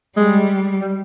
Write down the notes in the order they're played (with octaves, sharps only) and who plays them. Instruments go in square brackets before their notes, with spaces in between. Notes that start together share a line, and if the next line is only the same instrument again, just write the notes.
[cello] G3 [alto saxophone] G#3
[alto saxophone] G3